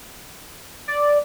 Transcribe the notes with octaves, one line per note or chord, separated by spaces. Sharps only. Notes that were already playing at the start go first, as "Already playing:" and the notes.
D5